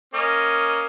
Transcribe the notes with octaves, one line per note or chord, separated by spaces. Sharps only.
A#3 C#4 D#5